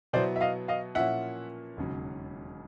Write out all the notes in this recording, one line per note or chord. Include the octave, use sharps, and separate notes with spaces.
B2 F#3 B3 E4 C5 D5
E5
D#5 F5
D#5 F5
A#2 F3 A#3 C#4 E4 E5 F#5
E1 D#2 C#3 F#3